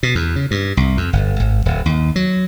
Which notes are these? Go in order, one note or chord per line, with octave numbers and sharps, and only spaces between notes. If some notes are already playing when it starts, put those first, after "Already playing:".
B2
E2
C#3
G2
C2
F2
G1
G#1
D1
D#2
F#3